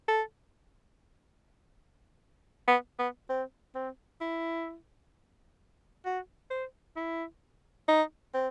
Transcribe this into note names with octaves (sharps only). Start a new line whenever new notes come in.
A4
B3
B3
C4
C4
E4
F#4
C5
E4
D#4
C4